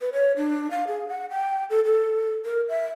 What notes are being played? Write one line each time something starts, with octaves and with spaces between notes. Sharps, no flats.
B4
C#5
D4
F5
G#4
F#5
G5
A4
A4
A#4
E5